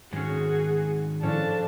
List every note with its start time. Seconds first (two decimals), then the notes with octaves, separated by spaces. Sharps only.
0.13 G#2 D#3 G#3 C#4 F#4 G#4
1.23 A2 F3 C#4 D4 A5